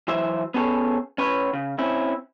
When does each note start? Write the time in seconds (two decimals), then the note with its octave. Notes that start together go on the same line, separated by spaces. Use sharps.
0.08 E3 F#3 C5 E5
0.54 B3 C#4 G#4 A4 C#5
1.18 C#4 B4 C#5
1.53 C#3
1.79 C4 C#4 E4